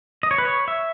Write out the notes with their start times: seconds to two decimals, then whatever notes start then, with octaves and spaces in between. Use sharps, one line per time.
0.23 D#5
0.31 C#5
0.38 B4
0.45 C#5
0.68 E5